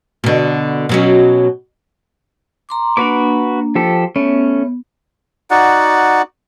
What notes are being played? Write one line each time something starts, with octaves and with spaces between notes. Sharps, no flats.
B2 D3
B2 F#3 C#4
A#5 C6 D6
A#3 D4 F#4 B4 D6
F3 G4 A4
A3 B3 C#4
D#4 F#4 D5 F#5